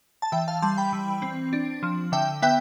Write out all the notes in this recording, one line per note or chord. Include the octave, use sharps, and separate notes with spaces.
A5
E3 E5 G5
F5 A5
G3 A5 C6
G5 B5
E3
C4
D4
F3
D3 E5 G5
B3 E5 G5